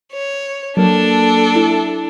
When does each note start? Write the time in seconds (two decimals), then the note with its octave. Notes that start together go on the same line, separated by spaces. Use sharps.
0.13 C#5
0.77 F#3 A#3 D4 A4
1.56 E4